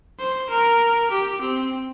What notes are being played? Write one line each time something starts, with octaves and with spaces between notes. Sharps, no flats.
C5
A#4
G4
C4